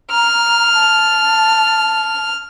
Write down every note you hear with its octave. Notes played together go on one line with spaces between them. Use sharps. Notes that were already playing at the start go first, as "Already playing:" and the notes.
A#5 F6
A5